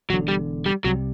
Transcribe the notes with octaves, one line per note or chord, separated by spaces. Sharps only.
E1 E2 D3 F#3
G3
G3
C2 C3 F#3 G3